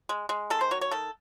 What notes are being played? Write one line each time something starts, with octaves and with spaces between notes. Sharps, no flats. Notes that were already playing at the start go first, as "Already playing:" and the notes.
G#3
G#3
D#3 A4
C5
F#3 C#5
C#5
D#3 A4